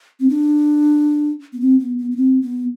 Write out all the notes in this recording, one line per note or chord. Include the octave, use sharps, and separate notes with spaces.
C4
D4
B3
C4
B3
B3
B3
C4
B3